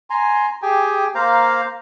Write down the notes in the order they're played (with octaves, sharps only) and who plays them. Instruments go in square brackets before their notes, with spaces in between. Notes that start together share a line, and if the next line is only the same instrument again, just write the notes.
[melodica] G#5 A#5 C6
G4 G#4 G5 G#5
A#3 C5 F5 A#5